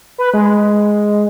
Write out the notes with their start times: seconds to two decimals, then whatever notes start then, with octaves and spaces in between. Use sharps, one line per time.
0.18 B4
0.34 G#3